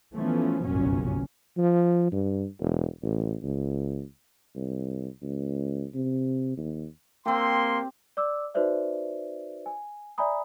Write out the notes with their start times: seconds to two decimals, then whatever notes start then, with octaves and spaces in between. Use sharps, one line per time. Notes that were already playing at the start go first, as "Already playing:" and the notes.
0.15 E3 F3 A3 B3 C#4
0.64 G1 C2 F#2 A#2 F#3 C#4
1.57 F3
2.12 G2
2.59 E1
3.02 A1
3.42 C#2
4.55 C2
5.22 C#2
5.95 C3
6.57 D#2
7.26 A#3 C4 G4 C6
8.17 D5 D6 E6
8.54 D#4 F#4 B4 C5 D5 E5
9.66 G#5
10.18 D5 E5 G#5 A#5 B5 D#6